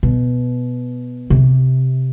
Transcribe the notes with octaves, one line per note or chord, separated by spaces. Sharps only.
B2
C3